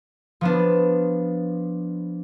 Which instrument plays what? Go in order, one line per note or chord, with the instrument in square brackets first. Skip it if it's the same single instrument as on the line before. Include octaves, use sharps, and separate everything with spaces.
[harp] F3 B3 D4